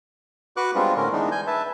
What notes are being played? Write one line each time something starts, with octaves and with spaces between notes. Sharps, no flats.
F#4 B4 C#6 D6 F#6
G3 G#3 B3 C4 D4 F4
A2 D3 C#4 A#4
E3 G#3 B3 D4 D#4
G#5 G6
B4 E5 A5